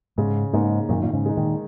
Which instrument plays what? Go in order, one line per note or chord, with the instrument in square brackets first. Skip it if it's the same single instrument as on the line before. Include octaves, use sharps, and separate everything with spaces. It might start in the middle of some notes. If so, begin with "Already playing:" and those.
[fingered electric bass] G#2 [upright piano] C#3
[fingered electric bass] G#2 [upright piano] A#3 D#4
[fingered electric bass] F#2 A#2 [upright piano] D#3
[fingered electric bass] A#2
G#2 C#3
[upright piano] G#3 D#4
[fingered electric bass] A#2 D#3